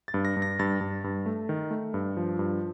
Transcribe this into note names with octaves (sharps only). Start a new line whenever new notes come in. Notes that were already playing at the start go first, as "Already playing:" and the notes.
A6
G2
A#6
G2
A#6
G2 A6
G2
G2
A3
D#3
A3
G2
F3
G2